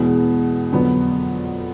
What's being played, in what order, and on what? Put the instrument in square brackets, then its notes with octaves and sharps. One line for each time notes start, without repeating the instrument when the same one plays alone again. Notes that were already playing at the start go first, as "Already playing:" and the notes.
Already playing: [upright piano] E2 B2 G#3
F2 D3 F#3 B3